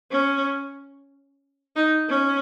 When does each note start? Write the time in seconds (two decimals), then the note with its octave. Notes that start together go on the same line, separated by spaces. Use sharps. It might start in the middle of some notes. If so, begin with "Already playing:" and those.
0.11 C#4
1.76 D#4
2.09 C#4